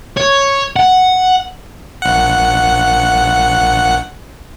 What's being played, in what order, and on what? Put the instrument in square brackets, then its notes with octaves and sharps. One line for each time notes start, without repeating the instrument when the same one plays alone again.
[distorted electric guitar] C#5
F#5
[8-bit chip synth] A#1 F#5